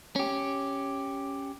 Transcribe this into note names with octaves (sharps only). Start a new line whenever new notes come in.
C#4 G4